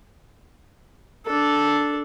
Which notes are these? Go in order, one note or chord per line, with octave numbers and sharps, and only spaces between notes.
D4 A4